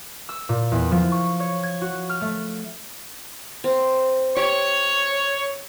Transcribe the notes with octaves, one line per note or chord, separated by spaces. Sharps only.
E6
A#2
E2
F3
C#6
C#5
G#6
F#4
F6
A3
C4
G4 C#5